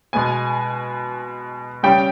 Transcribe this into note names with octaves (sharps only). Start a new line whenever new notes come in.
B2 G#3 B3 G#5
C#3 G3 C#4 G5